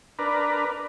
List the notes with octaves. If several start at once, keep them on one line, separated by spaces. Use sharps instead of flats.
D4 A#4 B4